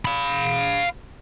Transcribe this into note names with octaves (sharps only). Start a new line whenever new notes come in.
F5 B5